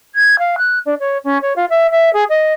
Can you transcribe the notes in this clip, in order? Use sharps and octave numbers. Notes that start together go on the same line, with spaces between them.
G#6
F5
F#6
D4
C#5
C#4
C#5
F4
E5
E5
G#4
D#5